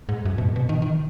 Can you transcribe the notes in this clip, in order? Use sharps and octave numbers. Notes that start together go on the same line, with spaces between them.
G#2
F#2
B2
G#2
B2
D#3
D#3